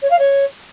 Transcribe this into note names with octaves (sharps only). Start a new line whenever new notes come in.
C#5
F5
C#5